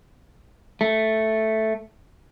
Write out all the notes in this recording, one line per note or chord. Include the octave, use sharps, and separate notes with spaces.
A3